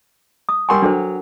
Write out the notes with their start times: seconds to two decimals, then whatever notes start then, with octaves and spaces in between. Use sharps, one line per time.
0.49 D#6
0.69 G3 A#4 F#5 G#5 C6 C#6
0.82 F#3 D4 A4 C5